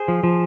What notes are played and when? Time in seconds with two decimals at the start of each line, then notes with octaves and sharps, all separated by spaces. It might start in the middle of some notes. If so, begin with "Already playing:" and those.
Already playing: G#4 C5
0.08 F3
0.24 F3